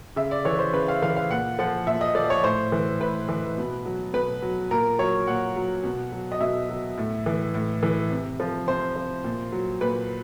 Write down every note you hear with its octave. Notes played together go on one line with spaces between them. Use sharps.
C#3 E5
D5
E3 C#5
C5
C#3 B4
F5
E3 F5
F5
A#2 F#5
F3 F#5
A#2 E5
D#5
F3 D5
C#5
A2 C5
E3
A2 B4
E3
B2
F#3
B2 B4
F#3
A#2 A#4
F#3 C#5
A#2 F#5
F#3
B2
F#3
D#5
B2 E5
F#3
A2
E3
A2
E3
C3
F3
C3 C5
F3
A#2
F#3
A#2 B4